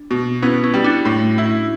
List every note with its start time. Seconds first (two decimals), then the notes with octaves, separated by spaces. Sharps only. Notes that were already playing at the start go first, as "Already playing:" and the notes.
Already playing: D4
0.11 B2
0.42 B3 C#4 E4
0.64 C#4 E4
0.74 G3
0.84 D4 F#4
1.05 A2
1.38 E4